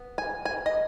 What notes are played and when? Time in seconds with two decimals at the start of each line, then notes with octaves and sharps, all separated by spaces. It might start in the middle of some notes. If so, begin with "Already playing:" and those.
Already playing: B3
0.18 G#5
0.45 G#5
0.66 D#5